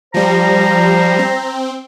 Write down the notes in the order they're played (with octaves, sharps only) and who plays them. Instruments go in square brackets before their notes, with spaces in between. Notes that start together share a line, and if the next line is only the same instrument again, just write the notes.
[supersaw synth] F3 G3 [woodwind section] C5 A#5
[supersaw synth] C4